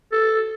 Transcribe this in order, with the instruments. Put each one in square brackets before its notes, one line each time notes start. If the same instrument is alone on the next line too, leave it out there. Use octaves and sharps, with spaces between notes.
[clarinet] A4